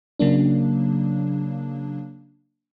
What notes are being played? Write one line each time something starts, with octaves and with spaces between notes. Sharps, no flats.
C#3 F#3 A#3 D4